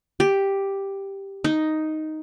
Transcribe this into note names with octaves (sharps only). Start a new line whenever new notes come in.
G4
D#4